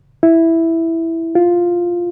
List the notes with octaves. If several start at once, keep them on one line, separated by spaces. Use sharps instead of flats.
E4
F4